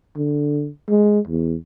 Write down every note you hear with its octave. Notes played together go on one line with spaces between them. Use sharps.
D3
G#3
E2